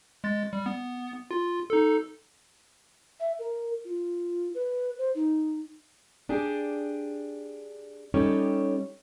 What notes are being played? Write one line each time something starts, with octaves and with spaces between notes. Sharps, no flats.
G#3 A6
G3
B3
F4
D#4 A4
E5
A#4
F4
B4
C5
D#4
D4 G4 G#4
G3 C#4 D#4 G4 A4 C#5